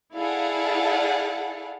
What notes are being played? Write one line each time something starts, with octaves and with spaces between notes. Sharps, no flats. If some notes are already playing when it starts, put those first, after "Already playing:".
E4 G#4 A4 D5 F5 F#5